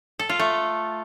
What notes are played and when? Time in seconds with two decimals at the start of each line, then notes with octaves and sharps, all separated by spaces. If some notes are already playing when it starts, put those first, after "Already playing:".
0.19 A4
0.29 F4
0.39 A3